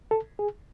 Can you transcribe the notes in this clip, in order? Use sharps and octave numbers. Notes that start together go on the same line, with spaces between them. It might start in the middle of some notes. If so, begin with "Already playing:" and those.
A4
G#4